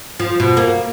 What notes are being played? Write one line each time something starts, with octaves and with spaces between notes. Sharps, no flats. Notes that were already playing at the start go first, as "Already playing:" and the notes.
F3
B2
A#3